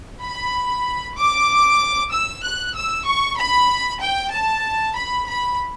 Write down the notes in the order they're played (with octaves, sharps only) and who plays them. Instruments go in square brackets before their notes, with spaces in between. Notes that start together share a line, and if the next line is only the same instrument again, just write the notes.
[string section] B5
D6
E6
F#6
E6
C#6
B5
G5
A5
B5
B5